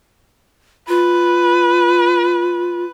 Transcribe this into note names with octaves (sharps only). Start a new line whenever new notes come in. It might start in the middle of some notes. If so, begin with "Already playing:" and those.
F4 B4